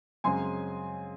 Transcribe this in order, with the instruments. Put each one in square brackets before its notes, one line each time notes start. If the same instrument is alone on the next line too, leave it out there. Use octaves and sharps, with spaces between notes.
[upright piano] F#2 C#3 G#3 C4 G#5 C6